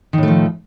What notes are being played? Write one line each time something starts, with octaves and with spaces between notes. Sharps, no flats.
A2 D#3 F3 A3